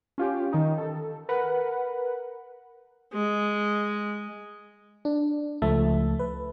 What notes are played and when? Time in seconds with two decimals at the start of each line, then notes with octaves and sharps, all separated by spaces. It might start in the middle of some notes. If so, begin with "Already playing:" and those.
0.18 C#4 F4 G4
0.53 D#3 D#4
0.78 A4
1.29 A#4 B4 F#5
3.13 G#3
5.05 D4
5.62 C#2 F3 A3 E5 A5
6.19 B4